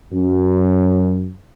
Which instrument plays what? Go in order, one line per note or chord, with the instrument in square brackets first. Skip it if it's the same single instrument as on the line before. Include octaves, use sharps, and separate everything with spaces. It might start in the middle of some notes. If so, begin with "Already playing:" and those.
[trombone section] F#2